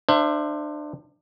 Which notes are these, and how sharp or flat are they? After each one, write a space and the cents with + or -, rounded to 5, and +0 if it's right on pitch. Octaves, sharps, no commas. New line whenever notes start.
D4 +30 C5 +0 E5 +35